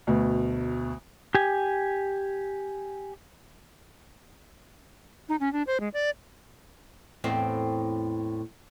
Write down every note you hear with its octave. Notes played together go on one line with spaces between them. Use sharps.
D2 B2
G4 G#5
D#4
C#4
D4
C5
G#3
D5
E2 A2 C4